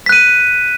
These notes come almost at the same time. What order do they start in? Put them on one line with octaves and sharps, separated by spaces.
B6 F#6 D#7